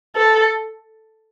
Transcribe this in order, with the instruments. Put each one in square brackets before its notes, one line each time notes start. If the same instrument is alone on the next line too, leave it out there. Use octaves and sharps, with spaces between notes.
[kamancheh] A4